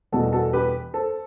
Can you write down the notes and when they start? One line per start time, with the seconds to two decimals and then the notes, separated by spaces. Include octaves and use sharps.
0.12 E2 B2 G3 F#4 A4
0.33 F#4 A4
0.53 G4 B4
0.94 A4 C5